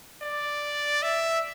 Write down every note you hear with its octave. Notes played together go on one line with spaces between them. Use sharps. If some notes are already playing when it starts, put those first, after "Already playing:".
D5
E5